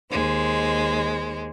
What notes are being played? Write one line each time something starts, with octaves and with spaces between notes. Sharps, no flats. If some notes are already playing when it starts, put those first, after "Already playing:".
D#2 G#3 C5